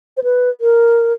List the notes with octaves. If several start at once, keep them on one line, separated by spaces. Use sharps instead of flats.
C5
B4
A#4